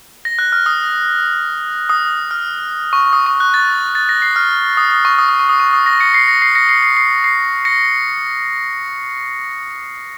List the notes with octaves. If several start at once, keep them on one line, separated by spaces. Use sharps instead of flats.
A#6
F#6
F6
D#6
D#6
F6
C#6
D#6
C#6
F#6
A6
A6
A#6
C7
F6
D#6
D#6
C#6
D#6
D#6
C#6
D#6
C#6
D#6
A#6
A#6 C#7
C7
A#6
C7
A#6 C#7
C7
C7
C7
C7
A#6 C#7